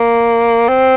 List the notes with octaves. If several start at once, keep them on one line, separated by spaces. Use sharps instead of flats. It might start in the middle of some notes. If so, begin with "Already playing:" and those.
Already playing: A#3
C4